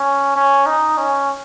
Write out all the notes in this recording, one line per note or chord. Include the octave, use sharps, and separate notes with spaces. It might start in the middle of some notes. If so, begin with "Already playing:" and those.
Already playing: C#4
C#4
D#4
C#4